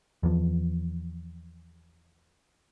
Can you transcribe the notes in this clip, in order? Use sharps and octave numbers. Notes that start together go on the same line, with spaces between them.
E2 F3